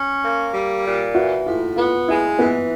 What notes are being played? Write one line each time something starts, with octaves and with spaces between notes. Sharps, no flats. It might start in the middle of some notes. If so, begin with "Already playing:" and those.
Already playing: C#4
A#3
G3
A#2
E3 F#4
A2 F4
B3 F4
G#3 E4
E3 B3